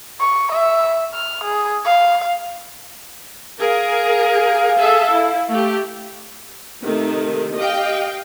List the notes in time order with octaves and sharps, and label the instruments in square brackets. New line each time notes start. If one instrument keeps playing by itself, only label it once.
[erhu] C#6
E5
F6
G#4
F5
[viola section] G#4 A#4 [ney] F5
[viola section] G#4 A4 E5
E4
A3 G4
[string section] C3 D#3 A3
G4 D#5 F5 G5